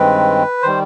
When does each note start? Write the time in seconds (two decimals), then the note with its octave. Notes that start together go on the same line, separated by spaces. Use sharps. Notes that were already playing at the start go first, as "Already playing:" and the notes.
Already playing: G2 D#3 G#3 C4 B4
0.62 D#3 G3 C5